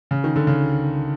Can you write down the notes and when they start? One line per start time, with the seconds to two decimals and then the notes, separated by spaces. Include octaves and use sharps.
0.11 C#3
0.24 D#3
0.36 D3
0.47 C#3